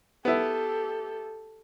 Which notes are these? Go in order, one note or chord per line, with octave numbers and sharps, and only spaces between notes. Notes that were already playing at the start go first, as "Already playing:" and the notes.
B3 E4 G4 A4